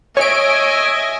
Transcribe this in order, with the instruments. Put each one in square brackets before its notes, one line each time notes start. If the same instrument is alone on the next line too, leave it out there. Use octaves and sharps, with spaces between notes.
[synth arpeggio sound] C#5 D7 [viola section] D#5 E5 G#5